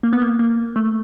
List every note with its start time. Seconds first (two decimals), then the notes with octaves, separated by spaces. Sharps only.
0.03 A#3
0.13 B3
0.22 A#3
0.39 A#3
0.76 A3